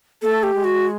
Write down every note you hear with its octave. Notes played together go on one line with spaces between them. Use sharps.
A3 A#3 A4
G4
G#3
F#4